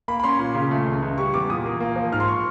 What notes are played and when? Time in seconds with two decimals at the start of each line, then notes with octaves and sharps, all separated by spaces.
0.08 A#3 B5
0.20 B5
0.23 C#4 C6
0.39 A#2
0.54 C#3
0.71 A3
0.86 C#2
1.02 C#2
1.18 G3 C#6
1.34 E2 D6
1.49 A#2 D#6
1.66 A#3
1.80 A#3
1.96 F3
2.12 G#2 F6
2.20 C6
2.28 C#6